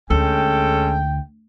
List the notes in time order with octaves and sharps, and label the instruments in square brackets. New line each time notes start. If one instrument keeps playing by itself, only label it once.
[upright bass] D2 [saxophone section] G#3 C#4 A4 [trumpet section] G5